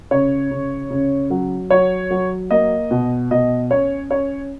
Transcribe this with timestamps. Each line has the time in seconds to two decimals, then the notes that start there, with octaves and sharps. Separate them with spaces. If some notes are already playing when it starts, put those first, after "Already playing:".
0.11 C#3 C#5
0.51 C#3
0.90 C#3
1.30 F#3
1.70 F#3 C#5
2.11 F#3
2.51 A#3 D#5
2.91 B2
3.31 B2 D#5
3.71 C#4 C#5
4.10 C#4 C#5